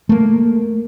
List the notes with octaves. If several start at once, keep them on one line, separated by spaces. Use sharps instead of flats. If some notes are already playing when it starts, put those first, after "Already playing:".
A3 A#3